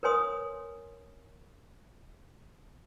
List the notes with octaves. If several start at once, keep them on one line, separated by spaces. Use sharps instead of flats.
A#4 B4 C#5 G#5 C6 D#6